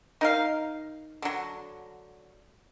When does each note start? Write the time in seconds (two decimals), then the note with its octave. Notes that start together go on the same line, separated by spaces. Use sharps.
0.21 D#4 A#4 F5
1.22 D3 F#3